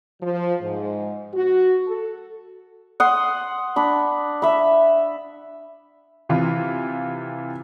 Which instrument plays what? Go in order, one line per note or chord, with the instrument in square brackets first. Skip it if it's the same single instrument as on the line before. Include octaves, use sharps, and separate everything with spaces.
[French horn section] F3
G#2
F#4
A4
[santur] F#5 C6 D#6
D4 B5
E5 B5
[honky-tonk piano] C3 E3 F4